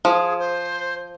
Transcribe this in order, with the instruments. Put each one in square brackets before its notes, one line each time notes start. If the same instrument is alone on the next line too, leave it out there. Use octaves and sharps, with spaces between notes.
[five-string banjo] F3 [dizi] G#4
[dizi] C5